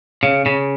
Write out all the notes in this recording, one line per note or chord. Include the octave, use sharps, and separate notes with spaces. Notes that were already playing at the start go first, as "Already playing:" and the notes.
C#3
C#3